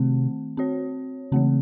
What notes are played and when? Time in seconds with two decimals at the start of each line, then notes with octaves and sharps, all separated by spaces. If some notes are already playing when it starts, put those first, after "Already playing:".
Already playing: C3 D#3 A3 C4
0.57 C4 F#4 C#5
1.32 C#3 E3 A3 C4